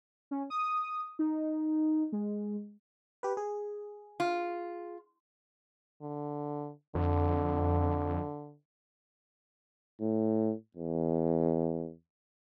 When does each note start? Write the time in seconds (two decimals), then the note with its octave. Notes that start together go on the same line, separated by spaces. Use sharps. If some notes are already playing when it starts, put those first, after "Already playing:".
0.31 C#4
0.50 D#6
1.19 D#4
2.12 G#3
3.23 G4 B4
3.37 G#4
4.20 F4
6.02 D3
6.95 F2 D3
10.01 A2
10.77 E2